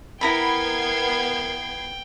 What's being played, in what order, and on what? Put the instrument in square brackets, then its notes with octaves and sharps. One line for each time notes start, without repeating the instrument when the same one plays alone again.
[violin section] B3 G#6 C7 [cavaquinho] E4 A#5 B5 [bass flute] A#4 [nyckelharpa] G5